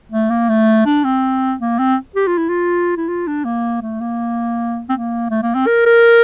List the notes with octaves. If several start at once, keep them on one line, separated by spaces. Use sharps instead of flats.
A3
A#3
A3
D4
C4
A#3
C4
G4
F4
E4
F4
E4
F4
D4
A#3
A3
A#3
C4
A#3
A3
A#3
C4
A#4
A#4